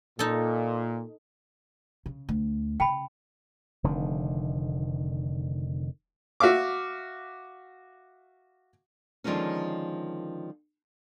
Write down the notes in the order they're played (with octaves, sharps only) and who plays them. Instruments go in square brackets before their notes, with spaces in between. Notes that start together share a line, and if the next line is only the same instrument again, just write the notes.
[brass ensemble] A#2 [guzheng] D#4 A4
[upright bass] C#3
D2
[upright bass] C#3 [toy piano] G5 A5 B5
[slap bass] F1 D3 D#3
[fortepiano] F#4 E5 F5 D6
[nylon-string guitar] D3 D#3 F3 G#3 A#3 C#4